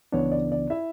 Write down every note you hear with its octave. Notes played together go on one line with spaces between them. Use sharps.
C#2 C#3 E3 B3 D4 C#5
D5
D5
E4 E5